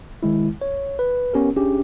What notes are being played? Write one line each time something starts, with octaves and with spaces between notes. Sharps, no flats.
D#3 G#3 E4
C#5
B4
B3 C#4 G4 A#4
C#4 D4 G4 G#4